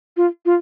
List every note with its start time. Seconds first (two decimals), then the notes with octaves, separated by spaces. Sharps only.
0.17 F4
0.45 F4